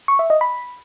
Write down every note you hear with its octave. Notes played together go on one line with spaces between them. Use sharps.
C#6
E5
D#5
B5